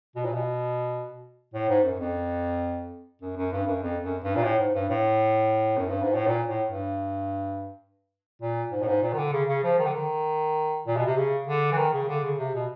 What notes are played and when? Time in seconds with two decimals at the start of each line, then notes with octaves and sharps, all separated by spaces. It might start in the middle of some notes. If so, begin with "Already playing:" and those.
0.15 B2
0.25 A#2
0.34 B2
1.54 A2
1.69 G#2
1.84 F#2
1.99 F2
3.21 F#2
3.37 F#2
3.52 G2
3.67 F#2
3.82 F2
4.03 F#2
4.23 G2
4.35 A#2
4.44 A2
4.59 G#2
4.74 G2
4.89 A2
5.77 F#2
5.89 G2
6.02 G#2
6.14 A2
6.27 A#2
6.48 A2
6.68 G2
8.41 A#2
8.72 G#2
8.82 A2
8.87 G#2
9.03 A#2
9.13 D#3
9.17 D3
9.33 C#3
9.48 C#3
9.63 F3
9.78 D#3
9.86 D3
9.93 D#3
10.87 A#2
10.96 B2
11.06 C3
11.16 C#3
11.47 D3
11.72 E3
11.78 D#3
11.93 C#3
12.08 D3
12.24 C#3
12.39 C3
12.54 B2